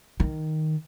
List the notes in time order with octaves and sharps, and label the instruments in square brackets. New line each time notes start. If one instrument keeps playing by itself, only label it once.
[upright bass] D#3